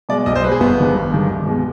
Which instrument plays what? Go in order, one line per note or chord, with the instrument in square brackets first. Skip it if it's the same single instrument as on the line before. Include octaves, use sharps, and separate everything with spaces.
[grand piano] B2 G#3 D5
B1 D#5
C5
B2 G#3 B4
G#4
G1 B3
G2 D#3 G#3
G1
G2 D#3 G#3
C2
B2 G#3